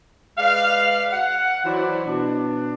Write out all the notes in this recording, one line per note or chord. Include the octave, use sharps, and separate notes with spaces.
G#3 B4 D5 F5
F#5
E3 F#3 E4 F#4 C5 D5
B2 D4